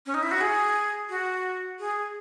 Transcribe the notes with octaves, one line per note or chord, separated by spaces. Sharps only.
C#4
D#4
E4
F#4
G#4
F#4
G#4